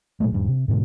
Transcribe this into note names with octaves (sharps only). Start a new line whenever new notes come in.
A#2 F#3 G#3 A3
D#1 G2
C3
G#2 B2 D3 G#3